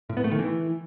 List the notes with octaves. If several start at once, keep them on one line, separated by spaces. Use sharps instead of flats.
A2
B3
A3
D#3
E3